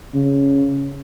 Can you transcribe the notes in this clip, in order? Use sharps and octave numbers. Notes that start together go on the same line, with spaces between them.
C#3